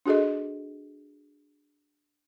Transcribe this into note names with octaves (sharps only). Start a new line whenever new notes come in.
D4 F#4 G#4 A4 D#5